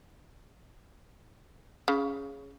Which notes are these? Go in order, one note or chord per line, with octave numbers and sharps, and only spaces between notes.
C#3